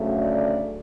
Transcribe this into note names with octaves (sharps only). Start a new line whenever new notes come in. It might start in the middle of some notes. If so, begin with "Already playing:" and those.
Already playing: D2 C#3 F#3 A3
D5